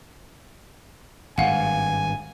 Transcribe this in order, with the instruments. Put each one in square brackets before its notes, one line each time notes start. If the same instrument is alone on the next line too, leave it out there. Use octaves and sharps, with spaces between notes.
[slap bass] G#1 G2 [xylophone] F5 F#5 [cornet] G#5